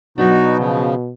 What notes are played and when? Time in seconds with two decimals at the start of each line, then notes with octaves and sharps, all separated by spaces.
0.18 B2 F#3 B3 D4 D#4 F#4
0.57 C#3 F3